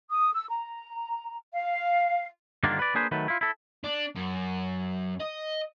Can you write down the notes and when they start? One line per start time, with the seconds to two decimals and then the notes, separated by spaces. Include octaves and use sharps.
0.11 D#6
0.34 E6
0.50 A#5
1.54 F5
2.64 G2 D3 D#3 A#3 D4 F4
2.79 B4 D5
2.95 A#3 D4 G#4 B4 C5
3.11 D#3 F#3 A3 B4
3.28 E4 F4
3.41 E4 A4
3.84 D4
4.15 F#2
5.20 D#5